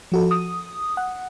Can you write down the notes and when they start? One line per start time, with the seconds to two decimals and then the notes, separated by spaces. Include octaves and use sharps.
0.12 F3 F#4 A4
0.31 D#6
0.97 F#5